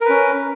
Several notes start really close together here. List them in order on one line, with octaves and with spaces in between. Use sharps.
A#4 B4 C#4